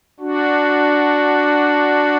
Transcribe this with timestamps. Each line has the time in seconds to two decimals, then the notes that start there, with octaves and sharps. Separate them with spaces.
0.20 D4 F#4